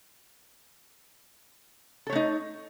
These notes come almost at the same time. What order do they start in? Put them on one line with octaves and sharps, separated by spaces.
A4 C#5 A3 D#4